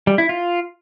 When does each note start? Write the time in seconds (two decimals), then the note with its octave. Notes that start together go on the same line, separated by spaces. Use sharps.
0.07 G3
0.18 E4
0.29 F4